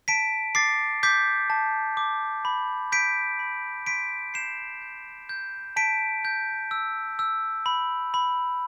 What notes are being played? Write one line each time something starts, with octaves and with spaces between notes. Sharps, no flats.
A5 B6 D7
D6 A6 C7
D6 G6 B6
A5
D6
B5
G6 B6 D7
B5
C6 B6 D7
G6 C7 E7
G6
G6
A5 B6 D7
G6
E6
E6
B5
B5